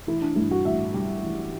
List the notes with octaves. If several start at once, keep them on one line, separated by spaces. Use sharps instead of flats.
E3 E4
D4
G2 E4
F#4
A1 E5
G3
E3